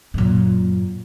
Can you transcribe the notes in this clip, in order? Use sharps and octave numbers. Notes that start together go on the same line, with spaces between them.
F#2 A#2